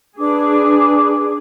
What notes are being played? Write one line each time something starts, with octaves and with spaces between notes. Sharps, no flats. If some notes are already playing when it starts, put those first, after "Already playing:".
D4 G#4 B4 D6